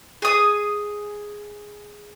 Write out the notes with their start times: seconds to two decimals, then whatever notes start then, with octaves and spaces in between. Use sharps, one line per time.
0.22 G#4 D#6